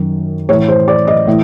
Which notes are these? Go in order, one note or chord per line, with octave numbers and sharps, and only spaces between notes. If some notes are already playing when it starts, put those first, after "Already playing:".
Already playing: F#2 D#3
A2 E3 C#5
C5
D5
D#5
A2 E3